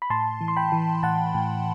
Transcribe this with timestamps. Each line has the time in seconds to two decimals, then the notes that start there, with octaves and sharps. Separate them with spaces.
0.02 B5
0.10 A2 A5 C6
0.41 E3
0.48 C6
0.56 G5 B5
0.72 E3
1.03 A2 F#5 A5
1.34 A2